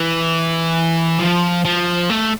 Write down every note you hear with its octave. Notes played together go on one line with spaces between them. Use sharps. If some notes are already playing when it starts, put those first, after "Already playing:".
Already playing: E3
F3
F3
A3